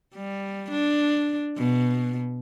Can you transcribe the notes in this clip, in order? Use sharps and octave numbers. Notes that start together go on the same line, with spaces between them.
G3
D4
B2